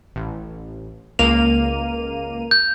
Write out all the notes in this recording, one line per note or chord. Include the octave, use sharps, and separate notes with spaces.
A1
C#2 A#3 D#7 F7
G6